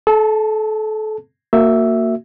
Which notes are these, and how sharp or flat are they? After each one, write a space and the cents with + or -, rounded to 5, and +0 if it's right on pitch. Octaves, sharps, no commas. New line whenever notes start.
A4 -30 A5 +20
A#3 -20 F#4 +0 E5 +0